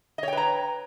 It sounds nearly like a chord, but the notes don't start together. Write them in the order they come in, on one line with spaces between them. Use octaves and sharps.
D#5 C#5 G5 B4 A#5